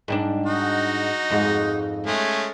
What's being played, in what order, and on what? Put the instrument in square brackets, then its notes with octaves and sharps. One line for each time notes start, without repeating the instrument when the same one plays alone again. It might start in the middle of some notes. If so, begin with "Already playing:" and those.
[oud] G#2 G3 D4
[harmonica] D#4 F#4
[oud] F2 G#2 G#4
[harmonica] G#3 A3 C#4